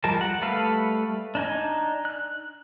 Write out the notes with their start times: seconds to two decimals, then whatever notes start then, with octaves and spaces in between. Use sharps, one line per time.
0.04 F3 G3 G#3 A#4 A5
0.21 F#5
0.41 G3 A3 A4 B4 F5
1.35 D4 D#4 G#5
2.05 F#6